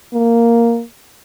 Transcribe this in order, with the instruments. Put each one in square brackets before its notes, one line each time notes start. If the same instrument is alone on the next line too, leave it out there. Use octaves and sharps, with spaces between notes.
[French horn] A#3